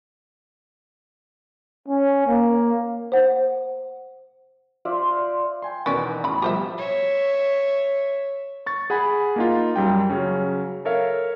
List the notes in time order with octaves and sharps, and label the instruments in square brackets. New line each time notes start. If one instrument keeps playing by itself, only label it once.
[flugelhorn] C#4
A#3
[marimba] C5 F#5
[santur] F4 C5 D5 E5
[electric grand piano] G5 G#5 C6
[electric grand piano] E2 B2 D#3 [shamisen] C#4 B4 D5
[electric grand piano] A2 [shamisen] C#3 B5
[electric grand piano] B2 F3 G3 [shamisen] G4 C5 E5
[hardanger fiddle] C#5 E5
[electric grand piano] C#6 A6
G#4 F#5 G#5 B5
A#3 D#4 F4
F#2 G3 G5
C#3 F#3 C#4
A4 A#4 C#5 E5 F5